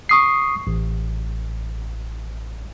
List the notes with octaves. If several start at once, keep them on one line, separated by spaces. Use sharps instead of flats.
C#6 D#6 C7
A1